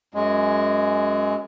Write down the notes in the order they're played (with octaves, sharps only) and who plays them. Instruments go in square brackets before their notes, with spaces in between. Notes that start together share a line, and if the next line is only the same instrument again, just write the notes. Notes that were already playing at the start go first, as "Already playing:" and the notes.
[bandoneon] F#2 G#3